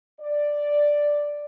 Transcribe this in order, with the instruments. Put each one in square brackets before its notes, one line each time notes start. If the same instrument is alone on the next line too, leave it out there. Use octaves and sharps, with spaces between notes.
[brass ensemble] D5